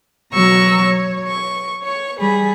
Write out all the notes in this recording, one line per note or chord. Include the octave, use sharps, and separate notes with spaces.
B2 F#3 F#4 A#5 C#6 E6
C#5
C#6
C#5 C#6
G3 G#4 B5